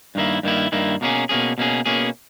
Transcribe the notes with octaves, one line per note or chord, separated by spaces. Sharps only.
G2 D#3 A#3 E4
G2 D#3 A#3 E4
G2 D#3 A#3 E4
B2 A#3 C#4 G#4
B2 A#3 C#4 G#4
B2 A#3 C#4 G#4
B2 A#3 C#4 G#4